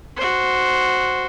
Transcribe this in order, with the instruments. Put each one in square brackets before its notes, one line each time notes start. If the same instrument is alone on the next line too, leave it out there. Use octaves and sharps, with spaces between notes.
[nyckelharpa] F#4 C5